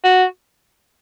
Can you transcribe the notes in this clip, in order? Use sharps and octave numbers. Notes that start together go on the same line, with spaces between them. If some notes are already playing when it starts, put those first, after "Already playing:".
F#4